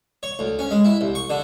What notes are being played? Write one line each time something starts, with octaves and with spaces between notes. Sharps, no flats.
C#5
D2
C#4
G#3
E4
C2
C#6
D3